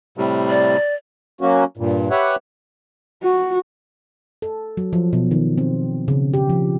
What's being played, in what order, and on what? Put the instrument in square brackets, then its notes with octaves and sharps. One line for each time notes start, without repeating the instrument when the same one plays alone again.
[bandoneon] A2 C3 G3
[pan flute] D5
[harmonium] F#3 A#3 C#4 F#4
G2 A#2
G4 B4 C#5 E5 F#5
[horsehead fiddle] F#4
[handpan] A4
F#3
F3
B2
D#3
C4
C#3
G4
F3